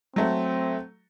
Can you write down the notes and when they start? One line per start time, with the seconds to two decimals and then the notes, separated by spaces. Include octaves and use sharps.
0.16 F#3 A3 C4